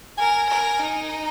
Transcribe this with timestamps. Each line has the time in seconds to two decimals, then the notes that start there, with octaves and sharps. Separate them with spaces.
0.18 A#4 G#5
0.49 A#4
0.79 D#4
1.09 A#5